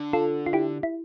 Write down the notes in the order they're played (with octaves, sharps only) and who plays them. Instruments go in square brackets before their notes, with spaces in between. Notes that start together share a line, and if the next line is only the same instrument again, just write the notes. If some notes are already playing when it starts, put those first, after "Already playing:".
Already playing: [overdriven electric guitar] D3
[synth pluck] F4 A4
F4
E4 G4
E4